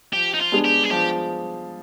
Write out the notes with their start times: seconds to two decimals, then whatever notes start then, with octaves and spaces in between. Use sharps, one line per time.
0.13 F3 G4
0.34 D#4
0.40 F4
0.52 G#3 B3 D4 G#4
0.65 G4
0.84 G#4
0.91 F3 G4